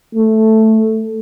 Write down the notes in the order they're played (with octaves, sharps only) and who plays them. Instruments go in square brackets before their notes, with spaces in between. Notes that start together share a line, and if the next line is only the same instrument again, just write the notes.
[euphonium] A3